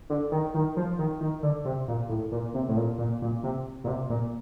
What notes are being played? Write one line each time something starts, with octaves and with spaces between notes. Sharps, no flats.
D3
D#3
D#3
F3
D#3
D#3
D3
C3
A#2
A2
A#2
C3
A2
A#2
A#2
A#2
C3
A#2
C3
A#2